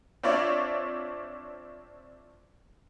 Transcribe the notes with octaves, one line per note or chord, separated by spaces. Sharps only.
C4 D4 F4 C#5 D5 E5